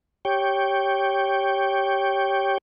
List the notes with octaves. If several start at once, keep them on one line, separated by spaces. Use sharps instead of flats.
G4 C#5 G5